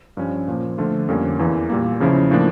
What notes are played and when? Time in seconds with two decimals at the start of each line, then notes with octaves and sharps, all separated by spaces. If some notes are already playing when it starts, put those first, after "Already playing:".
0.17 G2 F3 C#4
0.48 A#2 F3 A#3
0.78 D3 F3 A3 D4 F4
1.08 F2 D3 G3 A#3 C#4
1.39 E2 E3 A#3
1.70 A#2 G3 A#3
2.00 E2 C#3 F3 C#4 E4
2.31 A2 F3 A#3 D4